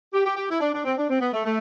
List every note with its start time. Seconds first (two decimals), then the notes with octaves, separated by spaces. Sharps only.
0.13 G4
0.26 G4
0.36 G4
0.50 E4
0.60 D4
0.74 D4
0.85 C4
0.98 D4
1.09 C4
1.21 B3
1.33 A3
1.45 A3